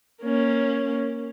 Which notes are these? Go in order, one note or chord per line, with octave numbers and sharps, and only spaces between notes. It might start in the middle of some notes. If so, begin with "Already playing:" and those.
A#3 C#4